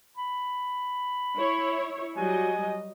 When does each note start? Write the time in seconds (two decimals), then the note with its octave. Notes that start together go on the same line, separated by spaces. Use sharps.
0.17 B5
1.37 E4 C#5
2.16 F#3 G3 D#5 G#5